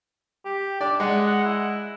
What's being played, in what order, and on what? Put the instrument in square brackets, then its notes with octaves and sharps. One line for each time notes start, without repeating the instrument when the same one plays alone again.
[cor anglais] G4
[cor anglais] D4 [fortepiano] D5
[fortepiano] G#3 D#5 [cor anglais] F#5
[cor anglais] F#5
E4